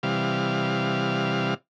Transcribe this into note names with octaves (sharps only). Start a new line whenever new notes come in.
C3 E3 G3 F5